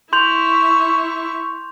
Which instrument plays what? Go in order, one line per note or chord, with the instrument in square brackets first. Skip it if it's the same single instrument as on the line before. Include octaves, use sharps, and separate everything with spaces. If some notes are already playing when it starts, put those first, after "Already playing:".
[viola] E4 C#6 [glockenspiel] C6 G6 F7